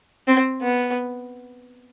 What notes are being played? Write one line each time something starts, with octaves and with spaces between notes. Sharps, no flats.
C4
B3